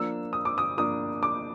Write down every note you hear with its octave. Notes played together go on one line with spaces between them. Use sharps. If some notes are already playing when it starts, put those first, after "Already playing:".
Already playing: F3 A#3 D4 E6
D#6
D6
D#6
F3 A#3 D4 D#6
D6